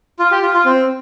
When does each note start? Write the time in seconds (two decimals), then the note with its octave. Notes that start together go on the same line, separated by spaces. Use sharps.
0.19 F4
0.32 G4
0.42 F4
0.54 F4
0.65 C4